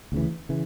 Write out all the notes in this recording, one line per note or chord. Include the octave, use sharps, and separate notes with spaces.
D2 C#3 E3
C#3 E3